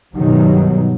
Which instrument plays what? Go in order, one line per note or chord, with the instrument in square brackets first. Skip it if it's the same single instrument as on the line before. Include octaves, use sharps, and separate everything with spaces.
[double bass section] G2 B2 D#3 F#3 G3